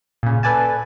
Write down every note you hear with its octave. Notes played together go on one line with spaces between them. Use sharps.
A#2 C#3
A4 B4 D5 G#5 A5